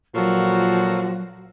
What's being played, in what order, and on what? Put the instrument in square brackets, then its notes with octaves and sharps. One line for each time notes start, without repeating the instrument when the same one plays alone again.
[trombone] A#2 [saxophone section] F3 F#4 [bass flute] F#3 [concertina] A4 A#4 C#5